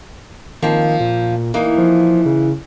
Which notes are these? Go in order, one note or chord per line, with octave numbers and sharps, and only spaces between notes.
D#3 F3 A#3 C4
A#2
E3 A#3 D#4
F3
C#3